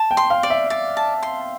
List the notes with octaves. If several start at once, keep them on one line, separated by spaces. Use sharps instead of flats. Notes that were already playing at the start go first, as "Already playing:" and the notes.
Already playing: A5
G5
C6
F5
D5
E5
D5
A5
C6